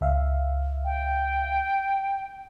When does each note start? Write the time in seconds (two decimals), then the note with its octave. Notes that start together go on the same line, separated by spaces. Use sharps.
0.01 C#2 E5 F5
0.85 G5